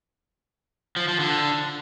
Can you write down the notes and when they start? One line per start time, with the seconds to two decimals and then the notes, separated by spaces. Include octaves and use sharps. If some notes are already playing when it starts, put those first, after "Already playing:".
0.96 F3
1.08 F3
1.20 D3